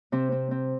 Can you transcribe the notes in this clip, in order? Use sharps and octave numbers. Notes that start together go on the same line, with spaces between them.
C3 C4
C4
C4